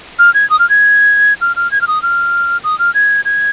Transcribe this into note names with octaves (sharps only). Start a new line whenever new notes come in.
F6
G#6
D#6
F6
G#6
F6
F6
G#6
F6
D#6
F6
D#6
F6
G#6
G#6